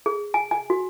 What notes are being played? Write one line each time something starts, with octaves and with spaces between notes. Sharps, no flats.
G#4
G#5
G#5
F#4